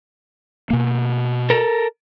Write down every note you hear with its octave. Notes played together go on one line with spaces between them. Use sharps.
B2 A#3
A4 A#4